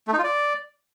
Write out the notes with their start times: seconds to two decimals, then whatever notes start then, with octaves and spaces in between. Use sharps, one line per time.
0.08 A3
0.13 D#4
0.18 F4
0.24 D5